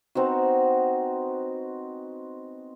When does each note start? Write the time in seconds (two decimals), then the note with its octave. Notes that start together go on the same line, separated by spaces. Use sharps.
0.15 B3 C4 D#4 F#4